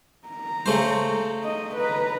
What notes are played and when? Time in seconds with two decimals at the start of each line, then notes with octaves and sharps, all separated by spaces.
0.28 A#5
0.66 C#3 A3 C5
1.44 D#5
1.76 B4 A#5